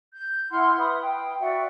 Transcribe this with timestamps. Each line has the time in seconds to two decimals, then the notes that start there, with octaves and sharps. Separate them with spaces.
0.14 G6
0.50 E4 F#5 C6 F6
0.78 B4 E5 B5 D#6
1.01 G5
1.40 F#4 D5 E5 F#5